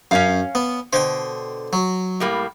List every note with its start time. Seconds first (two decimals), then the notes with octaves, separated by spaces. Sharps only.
0.11 F#2 C#4 C#5 F5
0.55 B3
0.93 B2 D3 C5 G5
1.73 F#3
2.20 A2 G3 A#3